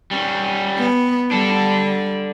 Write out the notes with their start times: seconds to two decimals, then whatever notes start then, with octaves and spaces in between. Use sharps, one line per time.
0.11 G3 C#4
0.78 B3
1.31 G3 D4 A4